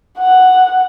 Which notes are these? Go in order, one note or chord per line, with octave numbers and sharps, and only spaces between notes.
F#5